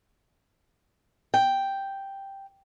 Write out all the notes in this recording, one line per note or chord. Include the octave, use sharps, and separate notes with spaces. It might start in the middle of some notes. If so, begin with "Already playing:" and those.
G5